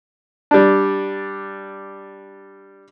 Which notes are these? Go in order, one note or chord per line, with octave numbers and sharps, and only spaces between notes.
G3 D4